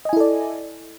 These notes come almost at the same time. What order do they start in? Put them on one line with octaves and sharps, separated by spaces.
D#5 G#5 E4 A4 D5